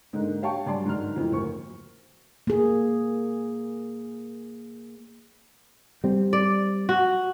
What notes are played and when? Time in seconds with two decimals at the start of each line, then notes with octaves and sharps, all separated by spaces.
0.13 G#2 D3 G#3 A#3 D4 D#4
0.42 G4 C#5 F5 G5 A5 C#6
0.66 G2 F#3 D5 G#5 A5 C6
0.85 G#2 D#3 F#3 F6
1.16 F2 G#2 E3 C4
1.31 F#1 D2 A#3 C5 C#6
2.47 A#3 G#4
6.04 G3 C4
6.33 D5
6.89 F#4